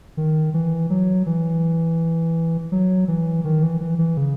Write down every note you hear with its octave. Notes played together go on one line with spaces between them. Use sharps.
D#3
E3
F#3
E3
F#3
E3
D#3
E3
E3
E3
C#3